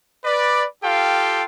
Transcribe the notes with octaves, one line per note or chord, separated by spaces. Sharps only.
B4 D5
F4 G4 A4 F5 G5